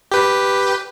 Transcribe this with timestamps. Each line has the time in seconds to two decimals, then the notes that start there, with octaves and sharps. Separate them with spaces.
0.12 G4 B4